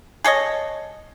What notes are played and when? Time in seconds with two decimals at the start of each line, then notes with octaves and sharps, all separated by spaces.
0.24 G#4 A4 C#5 D#5